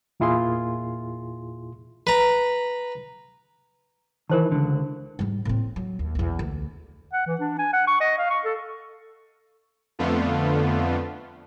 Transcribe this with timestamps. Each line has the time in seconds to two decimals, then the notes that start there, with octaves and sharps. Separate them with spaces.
0.20 E2 A#2 E4 F4 G#4 C6
2.07 B4 A#5
4.30 D#3 E3 A#4 C5 A5
4.52 C#2 D3
5.19 G#2 G3
5.45 A2 C4
5.76 F#3
5.99 D#2
6.15 B1 E2
6.39 D2
7.13 F#5
7.27 E3
7.41 D4
7.59 G#5
7.73 F#5
7.88 C#6
8.01 D#5
8.18 F5
8.30 C#6
8.45 A4
9.99 F2 D3 A3 B3 F4